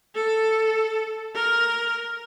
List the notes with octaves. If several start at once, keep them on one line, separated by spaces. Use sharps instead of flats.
A4
A#4